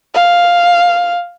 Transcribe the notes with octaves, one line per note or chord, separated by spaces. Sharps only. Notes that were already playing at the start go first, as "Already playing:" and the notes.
F5